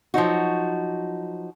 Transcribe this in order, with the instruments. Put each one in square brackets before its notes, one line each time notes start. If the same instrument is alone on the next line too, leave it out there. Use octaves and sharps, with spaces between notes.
[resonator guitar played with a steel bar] F3 F#3 D#4 F#4